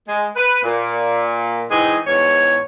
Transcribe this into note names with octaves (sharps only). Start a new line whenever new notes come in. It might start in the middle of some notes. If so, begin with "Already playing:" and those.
G#3
B4
A#2
E3 G#3 C4 D#4 G#4
E2 G#2 C#5